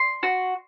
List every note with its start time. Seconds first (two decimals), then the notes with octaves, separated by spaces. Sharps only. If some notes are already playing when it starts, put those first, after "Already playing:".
Already playing: C6
0.23 F#4